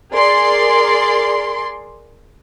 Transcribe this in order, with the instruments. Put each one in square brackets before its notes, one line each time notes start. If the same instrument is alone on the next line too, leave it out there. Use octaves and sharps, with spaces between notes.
[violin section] G#4 A#4 D5 C6